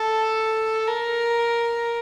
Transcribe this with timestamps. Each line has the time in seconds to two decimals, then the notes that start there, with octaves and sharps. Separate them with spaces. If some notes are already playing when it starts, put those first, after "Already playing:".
Already playing: A4
0.87 A#4